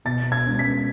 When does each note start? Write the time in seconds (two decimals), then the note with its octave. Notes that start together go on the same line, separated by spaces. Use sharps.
0.05 B2 A6
0.32 G#6
0.46 G#3 C#4
0.59 B6